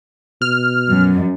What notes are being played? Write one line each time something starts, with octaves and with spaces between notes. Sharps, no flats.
B2 F6
F#2